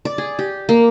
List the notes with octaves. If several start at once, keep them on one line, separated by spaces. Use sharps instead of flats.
D5
G#4
G4
A#3